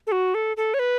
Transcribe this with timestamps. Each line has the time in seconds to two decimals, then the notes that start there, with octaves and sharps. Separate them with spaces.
0.07 A4
0.12 F#4
0.35 A4
0.57 A4
0.74 C#5
0.79 B4